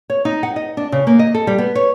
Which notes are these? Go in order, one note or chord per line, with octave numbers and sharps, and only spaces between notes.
C#5
D#4
F#5
D#5
D4
C#3
A#3
D#5
A4
G3
B3
C#5